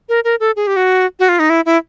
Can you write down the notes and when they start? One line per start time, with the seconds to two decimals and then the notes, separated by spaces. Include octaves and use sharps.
0.09 A#4
0.24 A#4
0.40 A4
0.56 G#4
0.67 G4
0.76 F#4
1.20 F#4
1.29 F4
1.39 D#4
1.50 E4
1.66 E4